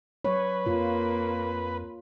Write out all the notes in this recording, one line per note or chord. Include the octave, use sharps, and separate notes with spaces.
F#3 B4 C#5
F2 A#3 F4